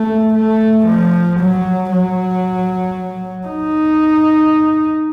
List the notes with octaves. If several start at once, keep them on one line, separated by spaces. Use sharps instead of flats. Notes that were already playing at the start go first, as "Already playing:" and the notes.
Already playing: A3
A3
F3
F#3
F#3
D#4